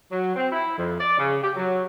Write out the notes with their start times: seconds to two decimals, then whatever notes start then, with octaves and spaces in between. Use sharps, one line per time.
0.12 F#3
0.35 C4
0.52 E4
0.78 F2
1.00 D5
1.19 C#3
1.43 G4
1.56 F#3